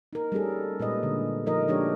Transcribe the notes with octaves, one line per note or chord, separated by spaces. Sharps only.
D#4 A#4
G3 A3 C#4 G#4 A4
A#2 G#3 B4 D#5
D3
F3 A3 D#4 A#4 D#5
F3 G#3 D4 G4 C#5